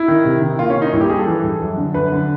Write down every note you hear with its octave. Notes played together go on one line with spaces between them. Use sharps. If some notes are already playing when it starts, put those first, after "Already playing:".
Already playing: E4
D#3
C3
D#3
A#3 F4
C#4
A#3
D#4
G2 E4
G4
G3 G#4
A4
E3
G2
F#2
D3
F#2 B4
D3